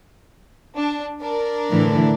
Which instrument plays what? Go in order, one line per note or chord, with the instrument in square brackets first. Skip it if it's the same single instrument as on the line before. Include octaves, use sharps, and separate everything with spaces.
[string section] D4
D4 A#4
[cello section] A2 D3 E3